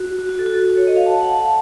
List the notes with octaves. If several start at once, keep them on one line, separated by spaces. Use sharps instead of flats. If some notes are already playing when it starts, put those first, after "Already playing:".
Already playing: F#4
F#4
F#4
A4
F#4
A4
C#5
D#5
F5
A5
F#5
A5